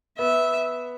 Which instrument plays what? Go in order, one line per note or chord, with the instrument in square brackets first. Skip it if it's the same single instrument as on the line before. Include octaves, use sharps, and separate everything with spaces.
[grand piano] B3 [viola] E5